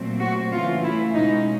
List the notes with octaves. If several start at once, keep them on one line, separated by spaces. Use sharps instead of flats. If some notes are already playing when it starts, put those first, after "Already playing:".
Already playing: A#2 F#3 A3 C4
F#4
C#3 E3 A3 F4
E4
B2 G#3 C#4 D#4